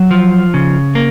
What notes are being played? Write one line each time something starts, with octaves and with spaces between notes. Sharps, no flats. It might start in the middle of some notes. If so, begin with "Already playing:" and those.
Already playing: F#3
F3
C#3
A#3